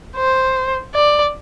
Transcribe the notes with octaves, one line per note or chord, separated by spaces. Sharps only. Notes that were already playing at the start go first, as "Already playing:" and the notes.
C5
D5